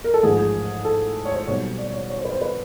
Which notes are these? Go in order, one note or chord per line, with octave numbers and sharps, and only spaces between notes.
A#4
A4
A1 G#2 F3 G#4
G#4
A4
C#5
C5
B1 B2 G3 C4 C#5
D5
C#5
C#5
C5
B4
C5
B4